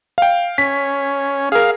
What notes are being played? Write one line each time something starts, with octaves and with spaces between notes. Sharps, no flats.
F5 G5
C#4 B6
G#4 A#4 F5